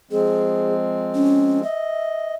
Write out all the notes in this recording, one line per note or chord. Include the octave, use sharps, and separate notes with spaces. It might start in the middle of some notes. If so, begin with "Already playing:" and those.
F3 G#3 C4 G#4
C#4
D#5 E5